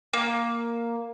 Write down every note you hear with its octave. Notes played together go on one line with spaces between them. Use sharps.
A#3